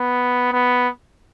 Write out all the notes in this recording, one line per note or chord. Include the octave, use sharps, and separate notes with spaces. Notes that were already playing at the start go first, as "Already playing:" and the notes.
Already playing: B3
B3